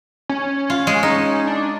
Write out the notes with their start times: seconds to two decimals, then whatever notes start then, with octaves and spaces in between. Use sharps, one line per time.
0.29 C#4
0.70 F4
0.87 G#3
1.03 D#4
1.47 D4